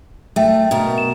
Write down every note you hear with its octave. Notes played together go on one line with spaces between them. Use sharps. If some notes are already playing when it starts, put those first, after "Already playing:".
A3 E5 G5
B2 A#4
E7